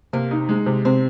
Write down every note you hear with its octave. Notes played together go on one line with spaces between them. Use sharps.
C3 A#3
D#4
G#3
C3
C3 C4